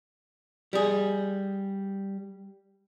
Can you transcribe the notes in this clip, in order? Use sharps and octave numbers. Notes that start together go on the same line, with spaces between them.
G3 G#4